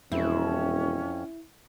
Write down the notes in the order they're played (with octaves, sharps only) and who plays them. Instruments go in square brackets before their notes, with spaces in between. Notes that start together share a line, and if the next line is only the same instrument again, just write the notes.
[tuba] E1 [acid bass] F2 [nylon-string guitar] C4 E4 [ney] C#4